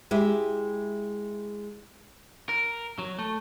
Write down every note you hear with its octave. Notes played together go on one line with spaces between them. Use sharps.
G#3 E4 G4 E5
A#4
F#3
A3